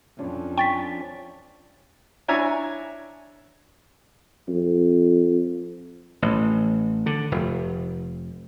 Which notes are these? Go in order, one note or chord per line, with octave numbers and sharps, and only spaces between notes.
F2 F3 C#4 D4
G5 C#6 A6 B6
D4 E4 C#5 G#5 A#5
F2
A1
D3
F1